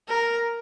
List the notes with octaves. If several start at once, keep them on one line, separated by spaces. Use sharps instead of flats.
A#4